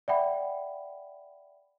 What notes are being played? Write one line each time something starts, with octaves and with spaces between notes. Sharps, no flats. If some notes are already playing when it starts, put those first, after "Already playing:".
D5 E5 F#5 G5 B5